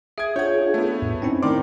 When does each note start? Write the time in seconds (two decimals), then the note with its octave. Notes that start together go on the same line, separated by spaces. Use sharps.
0.18 G#4 E5 D#6 G#6 D7
0.36 D4 F4 G#4 C#5 F#5 G6 G#6
0.74 A3 B3
1.02 F2 A2
1.22 C4 C#4 D#4 E4
1.42 A2 D#3 D5 C6 D6